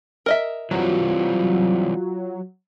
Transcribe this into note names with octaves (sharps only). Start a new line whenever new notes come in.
A#4 D#5 E5
E3 F#3 G3 C4 F4